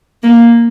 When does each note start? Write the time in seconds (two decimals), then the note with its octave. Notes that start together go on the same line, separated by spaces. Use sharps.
0.23 A#3